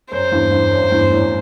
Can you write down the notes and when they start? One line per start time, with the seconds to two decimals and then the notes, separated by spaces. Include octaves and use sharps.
0.12 F#2 C5
0.32 E2 G2
0.51 E2 G2
0.71 F#2
0.91 E2 G2
1.10 F#2 A2